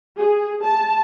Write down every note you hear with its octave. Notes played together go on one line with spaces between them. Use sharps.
G#4
A5